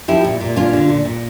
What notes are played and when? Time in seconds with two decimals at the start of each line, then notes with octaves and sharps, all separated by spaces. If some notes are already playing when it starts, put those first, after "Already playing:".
0.08 F3 E4 G4
0.24 A#2
0.40 A#2
0.56 C#4 D4 F4
0.73 D3
0.89 A#2
1.05 A#2